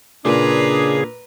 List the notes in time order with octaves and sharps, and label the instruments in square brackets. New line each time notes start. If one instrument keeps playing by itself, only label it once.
[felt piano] A#2 [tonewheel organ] C#3 G#4 [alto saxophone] D4 [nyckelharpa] B4 A#5